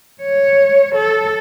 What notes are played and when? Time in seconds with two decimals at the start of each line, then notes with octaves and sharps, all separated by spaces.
0.22 C#5
0.95 A4